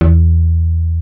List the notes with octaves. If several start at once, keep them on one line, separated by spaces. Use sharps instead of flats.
E2